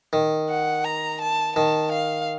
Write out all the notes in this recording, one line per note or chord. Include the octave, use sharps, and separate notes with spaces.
D#3
F#5
A#5
A5
D#3 A5
F5